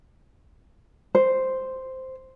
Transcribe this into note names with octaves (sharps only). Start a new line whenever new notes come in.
C5